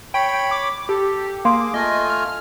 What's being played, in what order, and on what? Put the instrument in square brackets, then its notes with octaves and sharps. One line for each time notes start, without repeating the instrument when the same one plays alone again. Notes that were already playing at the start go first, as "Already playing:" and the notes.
[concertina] C#5 B5 [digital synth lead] G5
[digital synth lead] D6
[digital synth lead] G4 [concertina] A4
[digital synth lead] A#3 [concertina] G#4 D6 [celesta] F5 C6
[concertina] A3 F4 G#5 [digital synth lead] D#5
[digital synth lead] F6